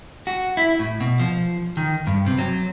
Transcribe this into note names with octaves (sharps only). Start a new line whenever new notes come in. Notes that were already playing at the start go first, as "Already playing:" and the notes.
F#4
E4
A2
B2
F3
D#3
G2
C3
F#3